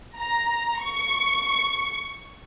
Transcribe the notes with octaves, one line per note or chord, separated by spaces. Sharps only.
A#5
C#6